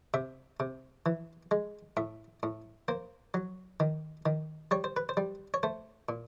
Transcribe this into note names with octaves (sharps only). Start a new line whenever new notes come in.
C3 E5
C3
E3
G#3
A2 E5
A2
A#3 C5
F#3
D#3
D#3
G3 C#5
C5
B4
C5
G3
C#5
A3 C5
A#2